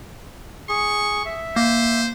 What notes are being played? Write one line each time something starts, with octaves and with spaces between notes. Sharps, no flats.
G#4 C#6
E5
A#3 C5